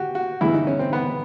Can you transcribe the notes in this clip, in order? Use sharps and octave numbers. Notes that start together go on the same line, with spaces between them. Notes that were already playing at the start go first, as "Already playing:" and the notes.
Already playing: F#4 G4
F#4
G2 E3 G#3 E4
D#4
C#4
C4
B3